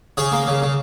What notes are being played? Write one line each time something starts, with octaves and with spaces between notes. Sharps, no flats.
C#3 G#4 C#5
A#3
C#3
C#3